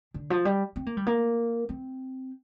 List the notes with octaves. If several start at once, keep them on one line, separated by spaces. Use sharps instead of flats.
D3
F3
G3
C4
A#3
G3
A#3
C4